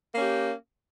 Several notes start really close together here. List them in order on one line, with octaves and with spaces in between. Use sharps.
A#3 C#4 G4